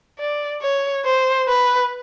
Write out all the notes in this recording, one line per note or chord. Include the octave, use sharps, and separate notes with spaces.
D5
C#5
C5
B4